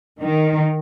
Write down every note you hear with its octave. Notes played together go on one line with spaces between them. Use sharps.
D#3